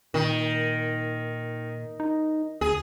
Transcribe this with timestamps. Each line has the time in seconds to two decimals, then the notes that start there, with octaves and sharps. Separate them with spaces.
0.14 A#2 D#3
2.00 D#4
2.61 D2 G#4